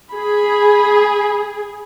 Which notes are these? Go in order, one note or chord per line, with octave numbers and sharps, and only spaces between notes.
G#4 B5